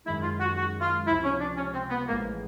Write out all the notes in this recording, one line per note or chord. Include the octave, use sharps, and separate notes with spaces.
F#2 D#3 G#3 E4
F4
F#4
F#4
F4
C#2 C3 F3 E4
C#4
D4
C#4
C4
B3
A1 A2 F3 G#3 A#3 B3